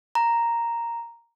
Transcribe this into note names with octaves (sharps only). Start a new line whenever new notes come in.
A#5